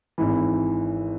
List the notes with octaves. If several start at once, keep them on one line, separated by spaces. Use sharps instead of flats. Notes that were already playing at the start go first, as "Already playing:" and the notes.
G#1 G#2 E3